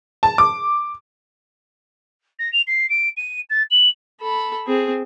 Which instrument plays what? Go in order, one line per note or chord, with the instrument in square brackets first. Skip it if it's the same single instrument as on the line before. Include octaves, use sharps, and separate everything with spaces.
[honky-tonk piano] A5
D6
[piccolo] A#6
F7
C7
D7
D#7
A6
F#7
[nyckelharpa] A4 B5
C4 G#4